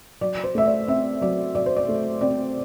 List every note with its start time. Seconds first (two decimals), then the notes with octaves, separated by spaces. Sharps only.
0.21 F#3 D5
0.44 C5
0.55 A3 E5
0.66 D5
0.88 C4 E5
1.22 F#3 D5
1.55 F#3 D5
1.66 C5
1.76 D5
1.89 A3
2.21 C4 D5